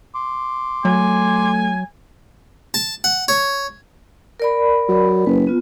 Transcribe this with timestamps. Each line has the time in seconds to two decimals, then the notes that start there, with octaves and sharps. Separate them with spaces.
0.15 C6 D6
0.85 F#3 A3 G#5
2.74 A5
3.04 F#5
3.28 C#5
4.40 A#4 D5 B5
4.89 F#3
5.26 F#1 B4
5.47 B3 F4